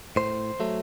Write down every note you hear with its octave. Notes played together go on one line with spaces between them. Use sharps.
A2 C5
F#3 A3